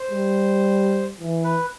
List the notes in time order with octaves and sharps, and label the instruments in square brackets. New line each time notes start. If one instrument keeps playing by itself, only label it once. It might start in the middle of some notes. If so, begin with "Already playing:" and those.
Already playing: [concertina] C5
[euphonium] G3
E3
[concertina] B4